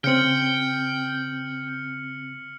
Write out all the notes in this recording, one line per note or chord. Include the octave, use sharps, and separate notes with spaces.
C#3 C4 G5 F6 C#7 F#7